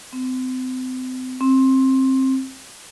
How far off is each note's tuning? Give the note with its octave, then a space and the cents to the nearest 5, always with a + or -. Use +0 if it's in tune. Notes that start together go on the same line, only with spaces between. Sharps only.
C4 -35
C4 +15